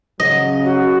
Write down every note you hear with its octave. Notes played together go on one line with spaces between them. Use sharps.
C#3 F#3 D#5
F#4